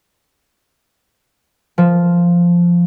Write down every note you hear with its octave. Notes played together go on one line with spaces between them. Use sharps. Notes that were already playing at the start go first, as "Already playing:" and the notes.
F3